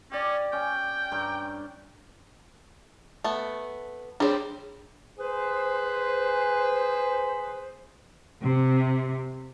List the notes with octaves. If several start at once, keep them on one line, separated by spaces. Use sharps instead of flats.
C#4 G4 D5
C#4 G5
G2 A#5
A3 B3
G3 C4 D4 G#4 C#5
G#4 B4 C5
C3